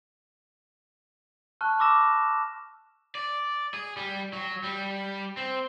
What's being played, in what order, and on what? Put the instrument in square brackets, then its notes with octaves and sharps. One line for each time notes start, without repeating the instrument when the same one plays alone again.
[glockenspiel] A5 C#6 F6 F#6
B5 C#6 D6 E6 A#6 E7
[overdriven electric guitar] D5
G#4
G3
F#3
G3
C4